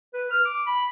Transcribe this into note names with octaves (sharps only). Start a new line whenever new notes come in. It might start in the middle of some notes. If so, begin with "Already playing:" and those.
B4
F6
D6
B5